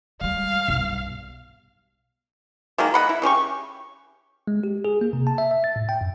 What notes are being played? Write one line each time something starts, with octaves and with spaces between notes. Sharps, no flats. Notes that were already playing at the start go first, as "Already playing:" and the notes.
G3 G#3 F5
B1 G2
D#3 F#3 G#3 A#3
D#5 F#5 B5
E4
C#3 C#4 G4 C#6
G#3
G4
G#4
A#3
C3
A5
E5
E5
A6
A2
G5
F#2